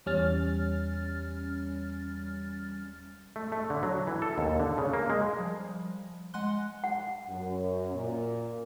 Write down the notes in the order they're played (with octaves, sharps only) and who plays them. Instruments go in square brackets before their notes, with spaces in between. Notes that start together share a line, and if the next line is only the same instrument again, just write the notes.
[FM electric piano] E2 G3 C#4 F6 A6
[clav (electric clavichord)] A3
A3
D3
F#3
E3
A4
D#2
D3
C#3
A#3
G#3
[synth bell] F3 G3
G#3 F#5 G#5 C6 F#6 G7
[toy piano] F#5
[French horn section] F#2
A#2